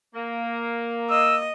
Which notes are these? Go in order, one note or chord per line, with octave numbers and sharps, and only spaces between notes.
A#3
D#5 E6